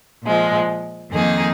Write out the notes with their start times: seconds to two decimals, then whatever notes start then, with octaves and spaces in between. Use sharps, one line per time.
0.24 A#2 F3 G#3
1.12 F2 D#3 A#3 D#4 G#4